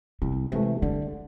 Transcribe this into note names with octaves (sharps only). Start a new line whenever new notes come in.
C2 G3
C3 E3 G#3 A3
D3 G3